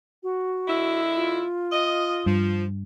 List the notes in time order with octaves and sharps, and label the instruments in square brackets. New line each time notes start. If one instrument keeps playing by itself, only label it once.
[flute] F#4
[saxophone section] D3 G#3 E4
[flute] F4
[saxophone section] D#5
[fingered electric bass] G2 [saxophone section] F3